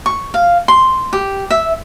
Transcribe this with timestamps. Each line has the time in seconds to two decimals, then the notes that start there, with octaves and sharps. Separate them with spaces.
0.06 C#6
0.34 F5
0.68 C6
1.13 G4
1.51 E5